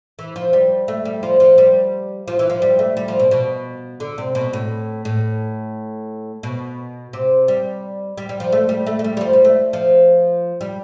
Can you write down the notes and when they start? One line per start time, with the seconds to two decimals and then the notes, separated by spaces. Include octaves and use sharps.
0.19 E3
0.36 F3
0.53 G3
0.88 A3
1.05 G3
1.23 F3
1.40 F3
1.58 G3
2.28 F3
2.39 E3
2.50 F3
2.62 G3
2.79 A3
2.97 G3
3.08 F3
3.20 B2
3.31 B2
4.00 D3
4.18 C3
4.35 B2
4.53 A2
5.05 A2
6.43 B2
7.13 C3
7.48 G3
8.18 G3
8.29 G3
8.40 F3
8.52 A3
8.69 G3
8.87 A3
8.99 A3
9.04 G3
9.17 G3
9.21 F3
9.33 G3
9.45 A3
9.73 F3
10.61 G3